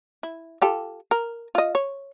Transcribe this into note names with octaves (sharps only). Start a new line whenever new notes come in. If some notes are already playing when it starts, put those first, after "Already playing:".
E4
F4 G4 A4
A#4
F4 D#5
C#5